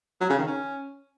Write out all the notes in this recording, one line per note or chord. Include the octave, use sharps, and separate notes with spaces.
F#3
C#3
D#3
C#4